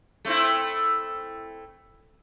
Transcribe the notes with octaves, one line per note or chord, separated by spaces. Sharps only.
A3 C4 E4